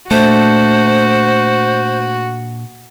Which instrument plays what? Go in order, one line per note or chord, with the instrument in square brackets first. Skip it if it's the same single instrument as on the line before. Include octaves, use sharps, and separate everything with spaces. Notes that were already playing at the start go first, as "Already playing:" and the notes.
[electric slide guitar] A#2 D4 A4 [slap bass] A3 [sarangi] F#4 [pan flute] C5